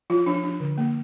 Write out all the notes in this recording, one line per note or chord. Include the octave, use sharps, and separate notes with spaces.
F3 F4
F3 D4
D4
D3
A#3